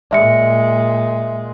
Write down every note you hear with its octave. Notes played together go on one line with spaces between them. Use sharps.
A#2 G#3 D5 E5 C#7